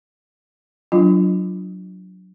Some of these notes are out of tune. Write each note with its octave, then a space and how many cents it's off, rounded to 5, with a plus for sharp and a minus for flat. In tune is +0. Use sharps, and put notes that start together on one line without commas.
F#3 +0 D4 +0 F4 -20